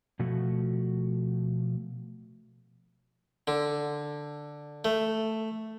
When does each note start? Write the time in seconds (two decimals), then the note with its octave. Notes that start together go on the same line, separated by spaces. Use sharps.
0.19 B2 F3 A3 F#4
3.47 D3
4.85 A3